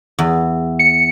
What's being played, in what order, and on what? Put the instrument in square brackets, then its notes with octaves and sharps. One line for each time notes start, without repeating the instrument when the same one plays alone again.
[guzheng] E2
[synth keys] C#7